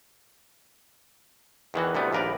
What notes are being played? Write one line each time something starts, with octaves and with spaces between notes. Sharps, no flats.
E2 D#3 E3 F#4
D2 C3 G3 B3
A#1 D#2 A#4 B4 D5